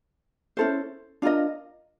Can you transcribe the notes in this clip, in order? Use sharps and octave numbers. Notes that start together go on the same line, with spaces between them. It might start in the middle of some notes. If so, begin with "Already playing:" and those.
C#4 E4 A4 C5
D4 F4 A#4 D#5